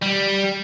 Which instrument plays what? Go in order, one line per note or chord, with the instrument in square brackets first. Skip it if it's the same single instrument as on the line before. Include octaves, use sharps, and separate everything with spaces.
[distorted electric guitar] G3